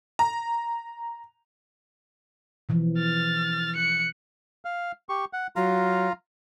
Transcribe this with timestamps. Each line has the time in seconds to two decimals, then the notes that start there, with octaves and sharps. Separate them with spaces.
0.19 A#5
2.69 B2 E3 F3
2.98 F6 A6
3.76 F#6 C#7
4.65 F5
5.09 G4 C#6
5.33 F#5
5.56 F#3 F4 F5 A#5